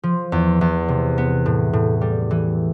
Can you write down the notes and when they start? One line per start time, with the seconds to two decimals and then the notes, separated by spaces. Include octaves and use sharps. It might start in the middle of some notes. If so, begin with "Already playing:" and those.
0.03 F3
0.32 E2
0.61 E2
0.89 C3
1.18 B3
1.46 A2
1.73 A2
2.01 G3
2.31 E3